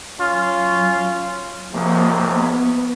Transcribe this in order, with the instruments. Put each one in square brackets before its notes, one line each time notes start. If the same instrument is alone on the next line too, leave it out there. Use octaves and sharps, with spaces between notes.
[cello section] F#3 [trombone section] C#4 F4
[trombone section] B1 G#2 C3 [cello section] F3 A#3
[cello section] B3